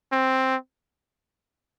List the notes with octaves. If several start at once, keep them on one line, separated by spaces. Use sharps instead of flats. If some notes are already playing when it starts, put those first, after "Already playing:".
C4